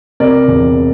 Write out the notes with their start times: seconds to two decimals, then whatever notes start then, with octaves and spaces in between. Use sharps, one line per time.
0.20 C3 A#4 D5
0.48 E1